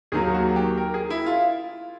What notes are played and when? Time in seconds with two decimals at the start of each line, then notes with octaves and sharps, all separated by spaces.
0.12 D#2 D#3 F#3 A#3 G#4
0.34 F#4
0.56 G4
0.78 A#4
0.94 G#4
1.10 E4
1.26 F4